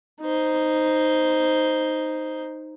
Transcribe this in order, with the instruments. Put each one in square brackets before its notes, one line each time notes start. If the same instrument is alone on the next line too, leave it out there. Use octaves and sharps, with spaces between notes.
[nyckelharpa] D#4 C5